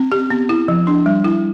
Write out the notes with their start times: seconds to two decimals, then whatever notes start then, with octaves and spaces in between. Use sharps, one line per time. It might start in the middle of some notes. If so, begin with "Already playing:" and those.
Already playing: C4
0.12 G4
0.30 B3
0.49 E4
0.68 F3
0.87 D4
1.06 G3
1.24 E4